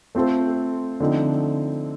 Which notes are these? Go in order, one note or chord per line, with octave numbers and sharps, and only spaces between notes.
A3 C4 F4 A4 C5
D3 F3 A3 C4 D#4